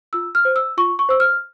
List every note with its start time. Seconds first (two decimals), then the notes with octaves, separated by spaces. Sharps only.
0.13 F4 E6
0.35 F6
0.45 C5
0.56 E6
0.78 F4 C#6
0.99 C#6
1.09 C5 E6
1.20 F6